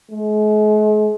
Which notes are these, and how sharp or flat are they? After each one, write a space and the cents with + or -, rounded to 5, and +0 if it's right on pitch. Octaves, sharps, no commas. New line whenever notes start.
G#3 +40